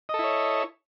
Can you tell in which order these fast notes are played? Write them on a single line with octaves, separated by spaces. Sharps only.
D#5 A4 E4 C#5